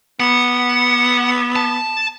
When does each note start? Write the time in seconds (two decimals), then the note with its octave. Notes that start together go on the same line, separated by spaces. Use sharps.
0.20 B3 F#5
1.56 A5